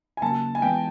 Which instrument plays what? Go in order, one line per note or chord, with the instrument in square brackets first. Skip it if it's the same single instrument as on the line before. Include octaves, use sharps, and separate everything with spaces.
[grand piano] G#5
[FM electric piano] C#3 F#3 A#3 [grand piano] A5
[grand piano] G#5
[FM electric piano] E3 G#3 B3 [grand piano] G5